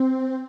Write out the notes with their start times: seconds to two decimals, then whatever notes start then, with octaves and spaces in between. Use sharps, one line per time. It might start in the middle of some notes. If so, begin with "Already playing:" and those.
Already playing: C4